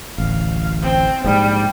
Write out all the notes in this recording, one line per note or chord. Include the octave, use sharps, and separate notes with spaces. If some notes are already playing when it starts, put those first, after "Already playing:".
D1 A1 F5
C4
A#1 G#2 G3